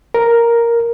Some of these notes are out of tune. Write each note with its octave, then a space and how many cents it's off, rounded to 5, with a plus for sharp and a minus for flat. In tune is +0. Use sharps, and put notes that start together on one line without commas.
A#4 +0